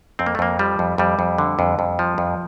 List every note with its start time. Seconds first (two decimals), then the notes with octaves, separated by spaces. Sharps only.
0.19 F2 C4
0.26 A#3
0.35 A3
0.39 F2 A#3
0.59 F3 G3
0.79 F2
0.98 F2 G3
1.19 F2
1.38 D3
1.59 F2
1.79 F2
1.99 F3
2.18 F2